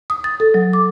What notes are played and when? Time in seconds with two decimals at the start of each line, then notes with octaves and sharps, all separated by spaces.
0.10 D#6
0.24 A6
0.40 A4
0.54 F#3
0.73 D6